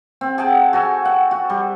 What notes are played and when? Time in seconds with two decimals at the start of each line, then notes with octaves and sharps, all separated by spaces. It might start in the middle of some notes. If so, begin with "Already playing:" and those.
0.21 C4
0.38 G#4 F#5 G5 A5
0.73 F#4 A4 G#5
1.05 F#5
1.31 F#4
1.50 G3